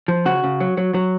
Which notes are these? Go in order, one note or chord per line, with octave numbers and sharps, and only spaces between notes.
F3
C#3 F#4
C#3
F#3
F#3
F#3